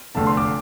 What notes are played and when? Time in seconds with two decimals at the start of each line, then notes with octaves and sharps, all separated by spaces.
0.15 F1 E2 D3 A3 A5
0.27 C6
0.37 D6